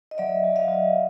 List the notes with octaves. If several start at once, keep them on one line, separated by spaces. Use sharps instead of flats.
D#5
F#3 D5 E5
F#3
D#5 F5
F#3